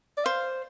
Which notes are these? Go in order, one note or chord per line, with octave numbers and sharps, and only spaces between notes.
D5
C5 F5